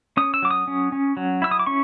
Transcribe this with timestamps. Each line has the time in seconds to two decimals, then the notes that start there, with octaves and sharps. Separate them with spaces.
0.17 C#4 D#6
0.34 E6
0.42 F#3 D6
0.51 D#6
0.68 C#4
0.92 C#4
1.17 F#3
1.42 E4 E6
1.51 D#6
1.59 D6
1.67 C#4 C#6